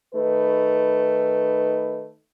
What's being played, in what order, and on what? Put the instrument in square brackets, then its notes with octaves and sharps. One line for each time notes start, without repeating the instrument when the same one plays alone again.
[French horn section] D#3 A3 D#4 B4